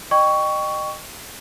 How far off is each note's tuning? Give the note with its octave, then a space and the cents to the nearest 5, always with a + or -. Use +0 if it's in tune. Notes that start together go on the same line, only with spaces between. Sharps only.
D#5 -30 G5 +5 C#6 +15